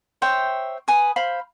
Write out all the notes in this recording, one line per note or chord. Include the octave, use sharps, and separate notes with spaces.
C5 C#5 E5 G5
B4 G#5 D#6
C5 F5 B5